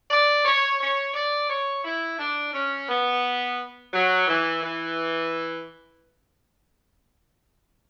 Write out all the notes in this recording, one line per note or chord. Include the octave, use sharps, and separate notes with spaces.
D5
C#5
C#5
D5
C#5
E4
D4
C#4
B3
F#3
E3
E3